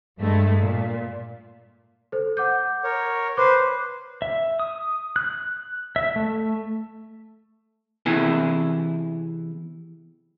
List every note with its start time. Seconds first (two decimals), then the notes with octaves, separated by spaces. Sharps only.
0.19 G2 G#3 A3
0.59 A#2
2.12 A4 C5
2.37 F#5 D6 G6
2.84 A#4 C#5
3.37 B4 C5 D6 C7
4.22 E5
4.59 D#6
5.16 F#6
5.96 E5
6.16 A3
8.06 C3 E3 B3 E4 G#4